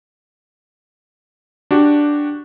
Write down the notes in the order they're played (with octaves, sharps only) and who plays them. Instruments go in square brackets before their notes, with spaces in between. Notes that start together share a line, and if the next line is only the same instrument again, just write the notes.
[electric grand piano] D4 F#4 G4